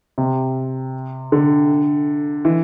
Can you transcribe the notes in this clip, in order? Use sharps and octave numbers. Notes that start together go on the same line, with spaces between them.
C3
D3
E3